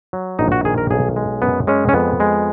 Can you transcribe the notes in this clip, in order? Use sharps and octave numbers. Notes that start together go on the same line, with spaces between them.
F#3
A#1 D#4
F#4
D#3 G#4
A#4
B1 G#4
G#3
F#2 B3
G#3 C#4
C#4
F2 B3
G#3